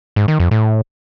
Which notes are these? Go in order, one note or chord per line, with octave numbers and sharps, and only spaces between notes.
G#2
D#3
F2
A2